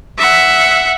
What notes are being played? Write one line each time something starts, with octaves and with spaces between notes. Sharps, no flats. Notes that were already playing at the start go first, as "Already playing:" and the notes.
E5 F#5